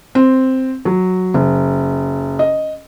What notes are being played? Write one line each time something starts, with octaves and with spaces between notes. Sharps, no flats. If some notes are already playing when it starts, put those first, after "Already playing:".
C4
F#3
F#1
D#5